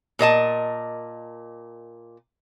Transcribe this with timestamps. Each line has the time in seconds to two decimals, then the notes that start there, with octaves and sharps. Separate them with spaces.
0.19 A#2 A#4 D#5 A5